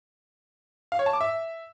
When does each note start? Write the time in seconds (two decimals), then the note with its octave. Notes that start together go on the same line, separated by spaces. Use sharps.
0.92 F5
0.99 C#5
1.06 A5
1.13 D6
1.21 E5